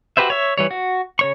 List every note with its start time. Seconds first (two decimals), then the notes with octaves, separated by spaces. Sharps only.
0.17 F#4 G4 B4 C5 E5
0.30 C#5 E5
0.58 E3 G3 C#5
0.71 F#4
1.19 C#3 C#5 C#6